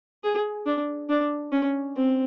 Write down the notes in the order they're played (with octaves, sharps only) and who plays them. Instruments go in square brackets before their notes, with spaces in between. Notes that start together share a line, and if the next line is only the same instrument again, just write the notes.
[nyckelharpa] G#4
D4
D4
C#4
C4